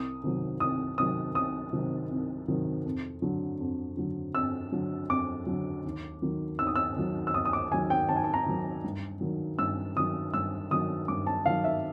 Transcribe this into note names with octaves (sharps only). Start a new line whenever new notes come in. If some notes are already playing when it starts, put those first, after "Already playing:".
Already playing: C2 D#6
C3 D#3 F#3
C2 D#6
C3 D#3 F#3 D#6
C2 D#6
C3 D#3 F#3
C2
C3 D#3 F#3
F2
D3 F#3
F2
D3 F#3
F2 E6
D3 F#3
F2 D6
D3 F#3
D#2
D#3 F#3
D#2 E6
D#6
E6
D#3 F#3
E6
D#2 D#6
D#6
D6
D#3 F#3 G#5
G5
D#2 A5
G#5
A5
A#5
D#3 F#3
G2
D#3 F#3
G2 E6
D#3 F#3 D#6
G2 E6
D#3 F#3 D#6
G2 D6
A5
D#3 F#3 F5
E5